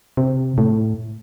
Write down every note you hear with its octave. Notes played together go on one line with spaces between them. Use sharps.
C3
A2